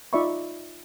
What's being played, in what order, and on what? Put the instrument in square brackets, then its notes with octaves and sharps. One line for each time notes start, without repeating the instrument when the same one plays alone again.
[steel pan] D#4 F4 D5 E5 B5 C#6